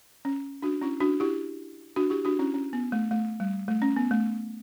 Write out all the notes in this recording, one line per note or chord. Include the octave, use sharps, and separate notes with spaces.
C#4
D4 F#4
C#4 E4
D4 F#4
E4 G4
D4 F#4
E4 G4
D4 F#4
C#4 E4
C#4
B3
A3
A3
G3
A3
C#4
B3
A3